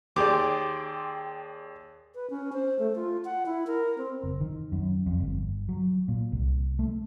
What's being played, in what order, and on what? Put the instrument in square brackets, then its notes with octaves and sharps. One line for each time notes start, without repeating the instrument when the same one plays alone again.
[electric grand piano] D#2 G#4 D5 [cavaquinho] G4 C5 D6
[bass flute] B4
C#4
C5
A3
F4
F#5
E4
A#4
C4
[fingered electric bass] F#1
D#3
F#2
F2
G1
F#3
A#2
C2
A3